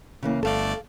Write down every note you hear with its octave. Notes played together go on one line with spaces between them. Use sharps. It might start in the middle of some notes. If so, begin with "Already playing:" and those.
C#3 E3 A#3
G1 A3 A4 D5 F5